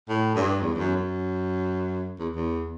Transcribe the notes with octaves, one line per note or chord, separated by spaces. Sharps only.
A2
G2
E2
E2
F#2
F#2
E2
E2